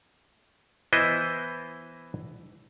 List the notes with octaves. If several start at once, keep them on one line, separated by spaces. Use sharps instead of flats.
E3 B3 E4 C5 D#5